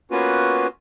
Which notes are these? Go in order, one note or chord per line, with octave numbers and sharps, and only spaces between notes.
A#3 B3 C#4 F4 F#4 B4